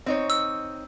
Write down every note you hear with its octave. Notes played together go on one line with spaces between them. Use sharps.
C4 D#4 C#5
E6